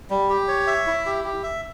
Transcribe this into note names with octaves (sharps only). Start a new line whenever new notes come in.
G3
G4
C#5
E5
E4
G4
G4
E5